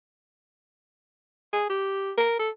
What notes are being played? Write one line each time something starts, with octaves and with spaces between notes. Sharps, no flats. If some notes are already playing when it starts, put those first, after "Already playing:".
G#4
G4
A#4
A4